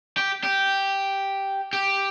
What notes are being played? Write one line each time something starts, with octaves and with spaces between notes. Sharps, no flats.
G4
G4
G4